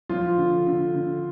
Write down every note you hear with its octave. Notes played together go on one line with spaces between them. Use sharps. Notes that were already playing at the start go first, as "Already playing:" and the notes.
F3 F4
D3
D3
D3